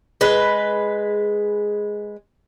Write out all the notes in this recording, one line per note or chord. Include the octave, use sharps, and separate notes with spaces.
G#3 B4